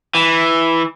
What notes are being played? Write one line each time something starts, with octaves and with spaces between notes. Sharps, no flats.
E3